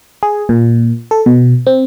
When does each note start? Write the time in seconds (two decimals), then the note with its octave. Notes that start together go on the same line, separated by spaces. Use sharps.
0.23 G#4
0.49 A#2
1.11 A4
1.26 B2
1.67 C4